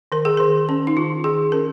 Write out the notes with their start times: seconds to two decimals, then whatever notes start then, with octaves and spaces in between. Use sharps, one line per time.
0.12 D#3 A#4
0.25 G#4
0.37 D#3 A#4
0.69 C#4
0.87 D#4
0.97 D#3 F4
1.24 D#3 G#4
1.52 C#4 A#4